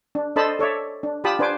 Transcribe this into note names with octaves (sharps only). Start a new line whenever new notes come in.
D4
D4 A4 C5 D#5 A5 B5
A4 C#5 D5 E5
D4
F4 G4 G5 A5 B5 D#6
D4 B4 C5 G#5 D6